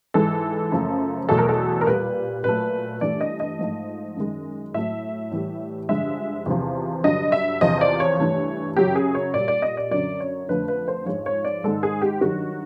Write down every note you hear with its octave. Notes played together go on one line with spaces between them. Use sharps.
G#2 E3 G#3 A4
F#2 C#3 F3 A3
E2 B2 F#3 A3 A4
A#4
A4
A#4
A#2 G3 B4
A#2 F#3 A3 B4
G2 E3 A3 D5
D#5
D#5
G#2 F3 A3
F#2 D#3 G#3
A2 F#3 A3 E5
A2 E3 G3
G2 D3 F3 G#3 E5
E2 C3 F3
G2 D3 F#3 D#5
E5
E2 C3 F3 D#5
D5
C#5
G2 E3 A3
F#2 C#3 F#3 G4
G#4
C#5
A#2 G3 D5
D5
D#5
D5
F#2 D3 F#3 D5
C#5
F2 D3 F3 A3 B4
B4
C5
G#2 F3 G#3 C#5
C#5
D5
G#2 D#3 G#3 A4
G#4
G4
G2 D#3 F#3 F#4